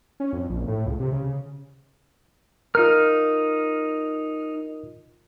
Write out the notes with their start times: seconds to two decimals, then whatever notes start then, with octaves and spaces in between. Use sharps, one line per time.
0.20 C#4
0.33 F2
0.50 A#1
0.67 A2
0.86 C#2
1.00 C3
1.12 C#3
2.75 D#4 F4 A#4 F6